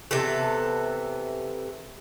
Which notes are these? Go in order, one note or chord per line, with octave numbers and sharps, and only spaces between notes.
C3 E3 B3 A4